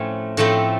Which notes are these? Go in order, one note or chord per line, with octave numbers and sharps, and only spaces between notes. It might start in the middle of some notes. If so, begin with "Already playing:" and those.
Already playing: A2 F3 A3 C4 C#4
A2 F3 A3 C4